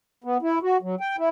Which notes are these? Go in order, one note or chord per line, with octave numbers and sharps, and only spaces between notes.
B3
E4
F#4
F#3
G5
E4